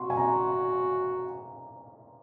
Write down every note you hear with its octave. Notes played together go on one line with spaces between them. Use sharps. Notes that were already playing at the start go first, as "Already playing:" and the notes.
Already playing: F#4 C6
G#5
A#5